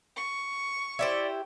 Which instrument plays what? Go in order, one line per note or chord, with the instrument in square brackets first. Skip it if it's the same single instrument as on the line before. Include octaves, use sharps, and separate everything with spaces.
[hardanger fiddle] C#6
[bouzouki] E4 G4 C5 [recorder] D5